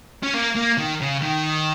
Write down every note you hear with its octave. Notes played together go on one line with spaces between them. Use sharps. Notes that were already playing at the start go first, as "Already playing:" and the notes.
C#4
A#3
A#3
D#3
C#3
D#3